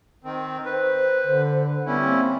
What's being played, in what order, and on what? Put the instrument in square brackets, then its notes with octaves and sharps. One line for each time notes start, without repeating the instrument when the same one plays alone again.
[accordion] D#3 C4
[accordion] B4 [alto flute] C5
[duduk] D3
[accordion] G3 C#4 E4 [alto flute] B3
[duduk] A#3 [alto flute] C4